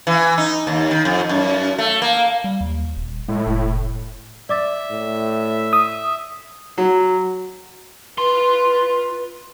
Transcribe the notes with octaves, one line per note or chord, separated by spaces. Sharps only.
E3
D#4
D#2
D#3
F2
F#2
A3
A#3
G3
D#2
D#1
A2 G#3
F1
D5 E5 D6 A6
A2
D#6
F#3
F4 B4 C6